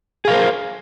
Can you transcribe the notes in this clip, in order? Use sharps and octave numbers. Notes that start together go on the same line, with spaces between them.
G#4 A#4 C5 F5